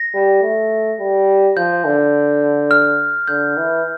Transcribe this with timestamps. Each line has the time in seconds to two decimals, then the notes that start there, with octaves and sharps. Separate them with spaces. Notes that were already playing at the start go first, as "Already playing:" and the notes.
Already playing: A#6
0.14 G3
0.43 A3
0.99 G3
1.56 F3 G6
1.85 D3
2.71 F6
3.28 D3 G6
3.57 E3